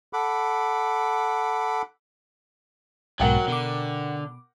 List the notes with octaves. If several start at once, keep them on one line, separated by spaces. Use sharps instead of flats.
A4 F#5 B5 D6
B1 G#2 B2 F#3 A#4 F#5 G5
B2 D3 D6